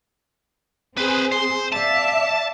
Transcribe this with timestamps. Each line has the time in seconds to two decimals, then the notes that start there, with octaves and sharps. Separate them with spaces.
0.97 C4 G#4 B4 C5
1.32 C5
1.72 D5 E5 F5 A5